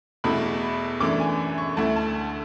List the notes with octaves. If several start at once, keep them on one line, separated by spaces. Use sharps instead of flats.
E2 B2 A3 E4 B5
F#2 E3 A3 D4 D6
G#5
C#6
D2 D3 A3 E4 A5
A5